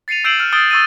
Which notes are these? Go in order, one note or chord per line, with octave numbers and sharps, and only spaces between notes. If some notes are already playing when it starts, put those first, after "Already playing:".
A6 C7 C#7 D#7 F7
E6 G6 C7 D7 E7 F#7
F6
D#6 E6 G6 A6 D7 G7
C#6 E6 A6 D#7